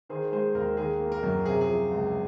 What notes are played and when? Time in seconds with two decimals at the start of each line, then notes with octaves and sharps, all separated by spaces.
0.09 D#3 G#4 C5
0.32 G#3 G#4 C5
0.55 D#2 A#4
0.77 D#3 G#4
1.00 A#3
1.12 A#4
1.23 F#2
1.46 C3 G#4
1.61 G#4
1.69 F3
1.91 C#2